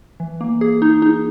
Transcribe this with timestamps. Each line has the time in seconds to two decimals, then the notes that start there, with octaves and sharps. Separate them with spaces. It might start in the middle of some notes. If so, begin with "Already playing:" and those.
0.20 E3
0.41 A#3
0.61 G#4
0.82 D#4
1.02 D#4